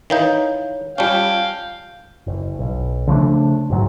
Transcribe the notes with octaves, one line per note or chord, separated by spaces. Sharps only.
D#3 E3 D#4 C#5 F5 G6
G3 C#4 F4 F5 G5 A5 G7
F#1
B1
C#3 F3 A3 D4
F#1 G#2 F#3